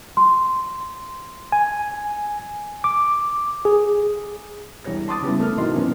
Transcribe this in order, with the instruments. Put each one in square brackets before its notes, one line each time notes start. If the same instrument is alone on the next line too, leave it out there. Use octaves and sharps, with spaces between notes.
[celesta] C6
[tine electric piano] G#5
D6
G#4
[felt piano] E1 C2 G3 C#5 A#6
A5 C6 D6 D#6 A6
C#3 G3 B3 C#4 E4
A3 A#4 F6
G#2 C3 E3 F#4 D#5 C6
F#2 B2 E3 A#3 B3 C#4